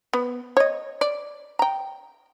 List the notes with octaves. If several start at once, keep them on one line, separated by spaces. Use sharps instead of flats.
B3
C#5 D#5
D5
G5 A#5